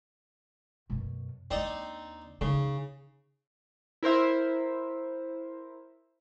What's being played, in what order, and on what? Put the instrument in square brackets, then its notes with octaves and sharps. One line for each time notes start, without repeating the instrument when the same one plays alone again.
[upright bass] F#2 B2
[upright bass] D#2 D4 [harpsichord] C4 D#4 D5
[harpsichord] C#3 [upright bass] D#4
[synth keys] E4 A#4 C5 E5